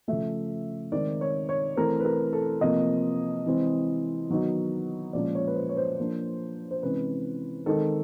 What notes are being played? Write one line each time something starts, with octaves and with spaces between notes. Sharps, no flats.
C#3 F3 A3 E5
D#3 G#3 C4 D#4 D5
C#5
C#5
E3 A3 C4 A#4
B4
A#4
A4
C3 F3 A#3 D#5
C3 E3 G#3 C4
D#3 F#3 B3 D#4
A#2 F3 G#3 C#4 D5
C#5
B4
C5
C#5
C5
F3 A#3 D4
C5
C3 E3 G#3 C#4 B4
D#3 G#3 C4 D#4 A4